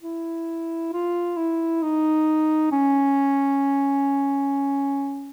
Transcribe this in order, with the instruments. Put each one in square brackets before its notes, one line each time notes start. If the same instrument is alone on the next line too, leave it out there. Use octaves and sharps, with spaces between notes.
[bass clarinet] E4
F4
E4
D#4
C#4